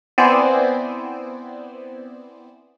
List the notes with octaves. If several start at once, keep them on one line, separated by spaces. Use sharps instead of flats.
B3 C4 E4 C5 D5 G#5